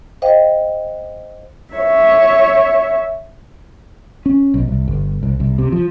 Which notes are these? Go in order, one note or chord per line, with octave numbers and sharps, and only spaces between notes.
C5 D#5 F5 G5
C#5 E5
C#4
B1
C2
G1
C2
C2
C3
F3